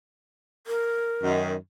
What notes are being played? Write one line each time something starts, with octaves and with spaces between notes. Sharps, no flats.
A#4
F#2 D#3